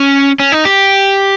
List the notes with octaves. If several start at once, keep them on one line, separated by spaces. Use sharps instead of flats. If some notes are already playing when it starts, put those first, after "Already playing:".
Already playing: C#4
C#4
D#4
G4